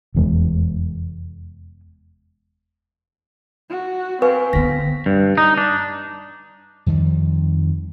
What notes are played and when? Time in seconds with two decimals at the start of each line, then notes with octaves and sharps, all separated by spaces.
0.15 F1 E2 G#3
3.69 F#4
4.22 C4 B4 F5 G#5 C#6
4.53 D3 B3 A#6 B6
5.06 G2
5.38 D#4
5.58 D4
6.86 F2 D#3 F3 G3